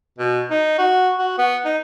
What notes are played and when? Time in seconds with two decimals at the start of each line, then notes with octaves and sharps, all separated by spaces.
0.18 B2
0.50 D#4
0.78 F#4
1.19 F#4
1.38 B3
1.65 D#4